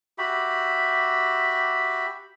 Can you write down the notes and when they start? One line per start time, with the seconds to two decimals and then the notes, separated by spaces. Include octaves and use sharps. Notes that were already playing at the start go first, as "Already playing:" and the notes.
0.18 F#4 G4 E5 B5